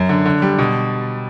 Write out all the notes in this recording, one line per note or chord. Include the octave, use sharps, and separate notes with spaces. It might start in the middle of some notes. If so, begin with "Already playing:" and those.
Already playing: F#2
D3
D3
G3
B2